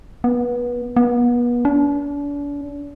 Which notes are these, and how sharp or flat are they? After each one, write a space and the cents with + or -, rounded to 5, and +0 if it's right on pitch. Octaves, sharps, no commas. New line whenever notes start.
B3 -25
B3 -35
D4 -40